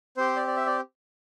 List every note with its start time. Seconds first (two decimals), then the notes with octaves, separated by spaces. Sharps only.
0.17 C4 G4 C5
0.36 D5
0.47 D5
0.56 E5
0.66 D5